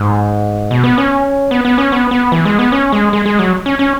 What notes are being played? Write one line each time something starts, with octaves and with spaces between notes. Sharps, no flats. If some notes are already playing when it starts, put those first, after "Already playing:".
Already playing: G#2
B2
B3
C#4
B3
B3
C#4
B3
B3
E3
G#3
B3
C#4
G#3
G#3
G#3
F#3
C#4
C#4